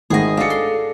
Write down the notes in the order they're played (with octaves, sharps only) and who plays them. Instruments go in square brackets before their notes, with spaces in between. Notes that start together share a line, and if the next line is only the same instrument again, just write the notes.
[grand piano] G#1 [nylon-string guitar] A3 F#5 [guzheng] G#4 D#5
[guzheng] D4 A4 [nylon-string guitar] F#4 G#4 [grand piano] F5 C#7
[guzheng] C6